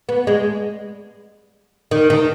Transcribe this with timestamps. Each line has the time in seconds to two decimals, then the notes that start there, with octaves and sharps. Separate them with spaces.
0.09 B3
0.27 G#3
1.91 D#3
2.10 D#3